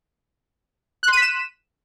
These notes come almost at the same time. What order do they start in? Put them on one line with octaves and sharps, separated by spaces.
F#6 C6 D#7 B6 E7